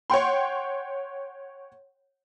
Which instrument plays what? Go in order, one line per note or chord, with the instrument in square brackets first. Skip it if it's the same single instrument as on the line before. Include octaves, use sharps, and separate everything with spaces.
[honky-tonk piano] C#5 F#5 G5 C6